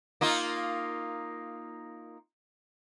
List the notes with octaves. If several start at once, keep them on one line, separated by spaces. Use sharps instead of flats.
A#3 D#4 F4